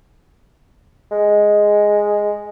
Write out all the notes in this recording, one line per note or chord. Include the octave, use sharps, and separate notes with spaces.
G#3